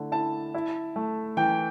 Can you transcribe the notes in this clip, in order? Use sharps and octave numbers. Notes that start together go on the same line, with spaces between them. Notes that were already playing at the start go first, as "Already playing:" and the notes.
Already playing: D3 A3 E4
E4 A5
E4
A3
E3 G5